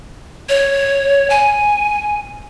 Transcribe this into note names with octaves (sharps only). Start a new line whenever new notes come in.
C#5
G#5